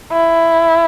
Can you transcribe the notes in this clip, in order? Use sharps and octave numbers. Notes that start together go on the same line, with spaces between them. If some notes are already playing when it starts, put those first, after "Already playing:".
E4